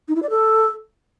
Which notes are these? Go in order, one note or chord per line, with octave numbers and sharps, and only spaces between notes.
D#4
E4
D5
A4